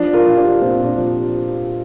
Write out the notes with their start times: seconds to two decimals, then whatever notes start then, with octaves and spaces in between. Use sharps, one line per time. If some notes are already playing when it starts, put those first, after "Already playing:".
Already playing: F3 D4
0.13 F4 A#4
0.26 F3
0.37 D4 G4
0.61 A#2 C4 F4
0.84 D4
0.97 F3